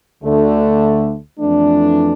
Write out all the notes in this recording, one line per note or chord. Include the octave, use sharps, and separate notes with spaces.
D2 D3 A3
F2 E3 A3 D4